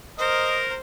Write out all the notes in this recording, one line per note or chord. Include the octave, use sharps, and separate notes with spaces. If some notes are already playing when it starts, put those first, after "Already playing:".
A#4 C5 D#5